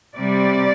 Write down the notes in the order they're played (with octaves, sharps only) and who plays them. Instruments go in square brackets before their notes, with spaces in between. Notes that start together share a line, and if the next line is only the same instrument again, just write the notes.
[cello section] C3 G3 D5